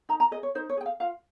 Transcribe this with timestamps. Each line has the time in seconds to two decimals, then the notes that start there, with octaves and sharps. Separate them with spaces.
0.09 D#4 A#5
0.20 A#5
0.31 G#4 D#5
0.43 C#5
0.55 D#4 C5
0.69 C#5
0.77 G#4 G5
0.86 F5
1.00 F4 F5